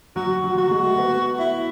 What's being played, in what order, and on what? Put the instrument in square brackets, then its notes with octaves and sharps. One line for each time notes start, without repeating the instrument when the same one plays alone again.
[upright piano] F#3 [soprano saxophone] F#4
[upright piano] F#3
[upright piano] F#3 [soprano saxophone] F#4
[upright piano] G#3
A3
B3
[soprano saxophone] E4